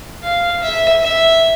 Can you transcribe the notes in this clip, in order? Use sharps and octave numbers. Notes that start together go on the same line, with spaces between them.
F5
E5
E5